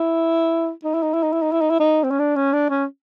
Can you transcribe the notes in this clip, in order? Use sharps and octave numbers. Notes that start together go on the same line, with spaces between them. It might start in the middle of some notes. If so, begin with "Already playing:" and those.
Already playing: E4
D#4
E4
D#4
E4
D#4
E4
D#4
E4
D#4
E4
D#4
C4
C#4
D4
C#4
D4
C#4